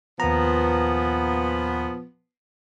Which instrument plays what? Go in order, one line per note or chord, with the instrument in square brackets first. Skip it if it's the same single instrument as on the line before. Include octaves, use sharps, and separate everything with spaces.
[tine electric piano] D#2 A#5 [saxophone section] A#2 F3 B3